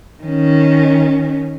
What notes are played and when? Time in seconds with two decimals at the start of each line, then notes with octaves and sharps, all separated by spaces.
0.23 D#3 C#4